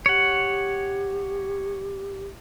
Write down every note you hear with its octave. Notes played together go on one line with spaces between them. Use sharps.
G4 C#5 F#5